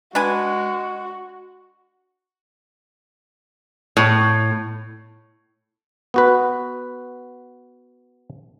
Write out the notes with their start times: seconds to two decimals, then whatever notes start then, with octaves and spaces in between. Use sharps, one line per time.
0.15 G#3 D4 F#4 B4 G#5
3.97 A2
6.14 B3 F#4 B4